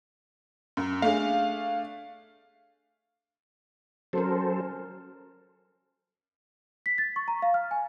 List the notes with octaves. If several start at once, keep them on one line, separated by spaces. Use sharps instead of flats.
F#2
A3 D4 G#4 F5
F#3 C4 C#4 A4 A#4 C5
B6
A6
C#6
A#5
F5
F6
G#5